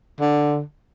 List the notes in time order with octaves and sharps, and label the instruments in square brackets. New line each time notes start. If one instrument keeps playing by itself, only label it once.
[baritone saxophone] D3